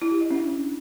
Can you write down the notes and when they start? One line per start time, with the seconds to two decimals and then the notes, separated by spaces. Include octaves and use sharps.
0.02 E4
0.11 G4
0.21 D#5
0.30 C#4
0.40 D4